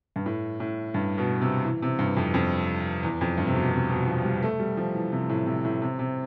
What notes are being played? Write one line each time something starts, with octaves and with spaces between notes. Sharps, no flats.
G2
A2
A2
G2
B2
C3
E3
C3
G2
F2
F2
E2
F2
G2
C3
B2
C3
B2
F3
G3
A3
G3
F3
E3
C3
A2
C3
A2
C3
C3